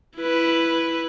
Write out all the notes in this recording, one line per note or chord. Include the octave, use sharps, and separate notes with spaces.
E4 B4